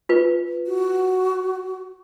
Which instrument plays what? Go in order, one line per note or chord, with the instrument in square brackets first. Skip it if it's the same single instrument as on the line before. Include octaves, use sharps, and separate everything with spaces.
[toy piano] F4 B4
[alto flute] F#4